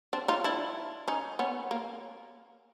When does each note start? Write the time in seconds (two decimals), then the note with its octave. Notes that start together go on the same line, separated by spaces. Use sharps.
0.13 C4 D4
0.28 D#4 F4
0.44 D4 E4
1.08 C#4 D#4
1.39 B3 C#4
1.71 A#3